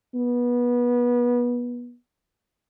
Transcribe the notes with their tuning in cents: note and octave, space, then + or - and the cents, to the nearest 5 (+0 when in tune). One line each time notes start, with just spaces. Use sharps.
B3 -25